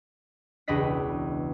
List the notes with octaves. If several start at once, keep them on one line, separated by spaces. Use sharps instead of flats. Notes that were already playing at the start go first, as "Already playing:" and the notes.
E1 C#2 D4 B4 D#5 B6